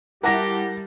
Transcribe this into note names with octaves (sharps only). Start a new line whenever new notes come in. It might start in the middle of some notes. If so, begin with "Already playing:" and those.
G3 E4 G4 A#4 F#5 A5 A#6